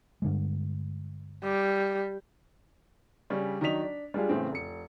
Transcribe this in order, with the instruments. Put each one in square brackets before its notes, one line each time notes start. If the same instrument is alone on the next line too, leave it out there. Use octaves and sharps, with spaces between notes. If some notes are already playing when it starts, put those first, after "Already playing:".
[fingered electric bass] G2 D3 G#3
[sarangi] G3
[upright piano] C#3 G3 C#4 D4
D#3 F#3 D4 D#5 B6 F7
D4
G3 G#3 D4 F4 G#4
A1 A2 C#3 C4
F1 C#7